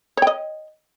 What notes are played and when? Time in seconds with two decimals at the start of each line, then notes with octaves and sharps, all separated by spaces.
0.17 C#5
0.22 G5
0.27 D#5